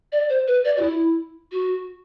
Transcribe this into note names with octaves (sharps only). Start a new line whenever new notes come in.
D5
C5
B4
D5
F#4
E4
F#4